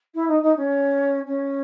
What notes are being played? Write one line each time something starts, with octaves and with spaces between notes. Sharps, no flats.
E4
D#4
D#4
C#4
C#4